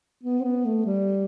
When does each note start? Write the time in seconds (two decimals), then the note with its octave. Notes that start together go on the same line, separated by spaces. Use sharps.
0.23 B3
0.40 C4
0.44 B3
0.65 A3
0.85 G3